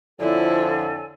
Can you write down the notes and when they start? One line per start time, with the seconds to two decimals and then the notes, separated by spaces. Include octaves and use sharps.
0.20 F2 D3 F3 E4 A4 C#5 G#5